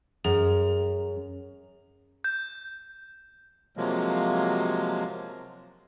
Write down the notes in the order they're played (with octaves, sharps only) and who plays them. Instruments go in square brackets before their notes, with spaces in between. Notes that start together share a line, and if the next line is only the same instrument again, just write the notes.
[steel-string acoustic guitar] F#2 [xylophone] G#4
[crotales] G6
[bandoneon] C3 F3 F#3 G#3 A#3